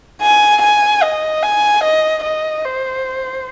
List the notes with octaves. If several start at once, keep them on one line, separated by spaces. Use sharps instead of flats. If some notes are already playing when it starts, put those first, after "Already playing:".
G#5
G#5
D#5
G#5
D#5
D#5
C5